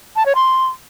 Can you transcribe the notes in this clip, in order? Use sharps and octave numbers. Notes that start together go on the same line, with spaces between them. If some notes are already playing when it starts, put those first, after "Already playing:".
A5
C#5
C6